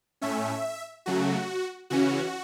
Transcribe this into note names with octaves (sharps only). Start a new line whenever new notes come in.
A2 A3 C#4 E5
C#3 F#3 A3 F#4
C#3 E3 C#4 F#4